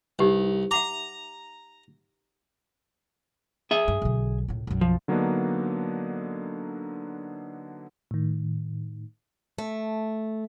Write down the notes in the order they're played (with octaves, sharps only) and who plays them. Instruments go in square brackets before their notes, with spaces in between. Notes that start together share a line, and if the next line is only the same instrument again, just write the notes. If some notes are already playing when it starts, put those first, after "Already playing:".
[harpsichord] C2 [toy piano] D#4 G4 B4
[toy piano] E5 F#5 D6 [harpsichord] A#5
[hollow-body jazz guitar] G#4 E5
[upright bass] G2
B1 D3
C#2 A2
B1 F#2
[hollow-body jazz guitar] F3
[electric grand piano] D3 F#3 A#3 B3 D4 D#4
[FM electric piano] A2 D#3
[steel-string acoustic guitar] A3